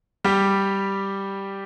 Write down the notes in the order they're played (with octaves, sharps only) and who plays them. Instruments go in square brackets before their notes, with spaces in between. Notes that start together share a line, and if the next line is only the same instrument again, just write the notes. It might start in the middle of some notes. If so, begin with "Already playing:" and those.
[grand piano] G3 G4